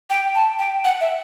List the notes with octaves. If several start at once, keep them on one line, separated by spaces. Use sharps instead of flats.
G5
A5
G5
F#5
E5